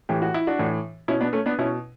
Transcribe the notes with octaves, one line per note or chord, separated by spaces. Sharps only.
A2 E3 G4
F#4
E4
D4 F#4
A2 E3
B2 C#4 E4
B3 D4
A3 C#4
B3 D4
B2 C#4 E4